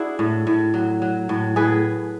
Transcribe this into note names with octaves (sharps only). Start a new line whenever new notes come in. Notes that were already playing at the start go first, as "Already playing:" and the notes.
Already playing: D4 E4 F#4 G#4
A2
A2
F#3
F#3
A2
A2 G#4 B4